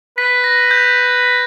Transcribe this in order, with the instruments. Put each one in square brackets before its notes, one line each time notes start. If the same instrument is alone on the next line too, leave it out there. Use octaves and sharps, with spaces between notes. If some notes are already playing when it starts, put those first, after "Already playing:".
[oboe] B4 [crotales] B6
[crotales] A#6
G6